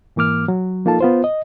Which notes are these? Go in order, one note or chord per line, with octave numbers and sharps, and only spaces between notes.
G#2 E3 A#3 D6 F6
F#3
F3 A#3 D#4 F4 A4 A5
B3 F4 C5
D#5